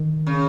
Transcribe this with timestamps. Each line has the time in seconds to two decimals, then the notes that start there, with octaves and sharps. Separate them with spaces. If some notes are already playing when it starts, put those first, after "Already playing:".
Already playing: D#3
0.27 C#3